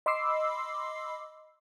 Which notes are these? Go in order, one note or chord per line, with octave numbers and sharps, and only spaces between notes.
D#5 B5 C6 D6 E6 C7